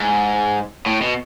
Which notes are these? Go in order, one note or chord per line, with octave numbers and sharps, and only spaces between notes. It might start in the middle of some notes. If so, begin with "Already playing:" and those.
Already playing: G#2
A2
B2